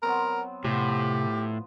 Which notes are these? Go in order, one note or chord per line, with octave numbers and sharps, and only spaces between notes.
F#3 B3 C4 A#4
A2 C3 F3 B3 G4